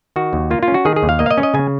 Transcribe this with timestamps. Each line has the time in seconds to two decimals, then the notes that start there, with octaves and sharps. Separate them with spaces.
0.16 D#3 F#4
0.33 D#2
0.51 A#3 F4
0.63 F4
0.68 C#4
0.74 F#4
0.85 D#3 G#4
0.96 G#4
1.03 D#2
1.09 F5
1.19 A#3 D#5
1.26 F5
1.31 D#5
1.37 C#4
1.43 D#5
1.54 C#3 G#5